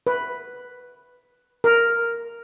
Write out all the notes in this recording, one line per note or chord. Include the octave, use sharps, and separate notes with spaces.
B4
A#4